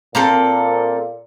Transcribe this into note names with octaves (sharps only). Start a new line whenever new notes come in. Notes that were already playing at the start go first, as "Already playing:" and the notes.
A#2 A#3 C4 A4